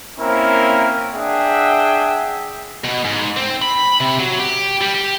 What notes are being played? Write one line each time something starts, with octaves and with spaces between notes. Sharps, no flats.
A#3 C4 C#4 E4 A#4
D4 G#4 E5 F#5 G5
B2
G#2
C4
B5
C3
F#3
G4
G3
G4